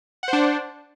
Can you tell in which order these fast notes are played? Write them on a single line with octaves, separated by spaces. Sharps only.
F#5 C5 D4